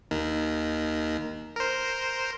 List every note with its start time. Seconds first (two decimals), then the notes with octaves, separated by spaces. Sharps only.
0.11 D#2 D#3
1.56 A#4 C5